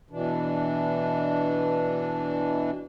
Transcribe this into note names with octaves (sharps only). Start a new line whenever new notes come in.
B2 E3 D4